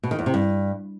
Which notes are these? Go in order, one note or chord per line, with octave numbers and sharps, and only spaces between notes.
B2
D#3
E2
C3
G2